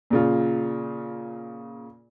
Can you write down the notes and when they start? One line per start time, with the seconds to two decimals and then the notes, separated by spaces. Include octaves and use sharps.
0.10 A#2 C#3 F4